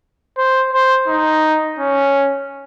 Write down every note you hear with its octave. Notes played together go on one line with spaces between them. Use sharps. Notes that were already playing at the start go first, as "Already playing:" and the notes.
C5
C5
D#4
C#4